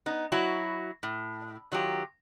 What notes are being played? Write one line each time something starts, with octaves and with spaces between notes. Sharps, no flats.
B3 D#4
F#3 E4 F#4
A2
D#3 F#3 F4 G4